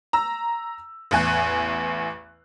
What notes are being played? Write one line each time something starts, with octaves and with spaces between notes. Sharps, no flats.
A#5 E6
A1 E2 G#5 F#6